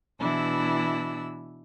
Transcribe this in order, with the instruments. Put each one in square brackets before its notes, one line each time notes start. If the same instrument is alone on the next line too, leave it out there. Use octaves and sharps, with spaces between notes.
[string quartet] B2 E3 D4 E4 E6